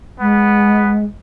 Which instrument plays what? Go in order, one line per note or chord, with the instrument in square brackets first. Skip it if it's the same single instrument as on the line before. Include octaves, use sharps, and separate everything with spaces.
[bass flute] G#3 [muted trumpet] B3